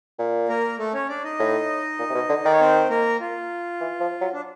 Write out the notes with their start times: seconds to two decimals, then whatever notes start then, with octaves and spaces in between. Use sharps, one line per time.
0.18 A#2
0.49 A#3 A#4
0.79 A3 A4
0.94 C#4 C#5
1.09 D4 D5
1.24 D#4 D#5
1.39 A2
1.99 A#2
2.10 C3
2.15 B2
2.29 D3
2.44 D#3 D5
2.53 C#5
2.61 C4 C5
2.90 A#3 A#4
3.20 F4
3.81 E3
4.00 F3
4.21 F#3
4.33 D4